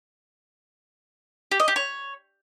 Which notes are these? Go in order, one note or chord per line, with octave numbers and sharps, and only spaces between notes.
G4
D#5
G4
C#5